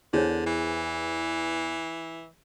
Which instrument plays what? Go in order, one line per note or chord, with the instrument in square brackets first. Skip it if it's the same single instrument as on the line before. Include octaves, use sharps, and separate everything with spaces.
[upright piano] E2 [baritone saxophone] D3 [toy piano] G#4 C5 C#5
[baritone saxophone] E3